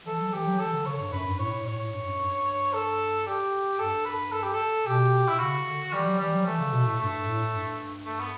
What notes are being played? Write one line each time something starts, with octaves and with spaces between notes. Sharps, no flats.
E3 A4
F#3
E3 G4
F#3
E3 A4
D3
C#3 C#5
G2
F#2 B4
G2
A2 C#5
A2
A2 C#5
A2
G2
F#2
G2
A4
G4
G2 A4
B4
A4
G4
A4
B2 G4
E4
C#3 F#4
D3
E3 G3
F#3
E3 G3
F#3
E3 A3
C#3
B2
A2
G2 A3
A2
G2
A3
B3